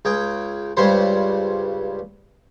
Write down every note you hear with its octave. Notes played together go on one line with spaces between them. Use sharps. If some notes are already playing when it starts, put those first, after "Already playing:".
C#2 G#4 G5
C#2 G2 G3 C5 C#5 C6